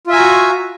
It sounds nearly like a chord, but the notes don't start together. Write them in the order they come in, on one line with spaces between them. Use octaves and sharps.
F4 E5 G#5 A#5 F#4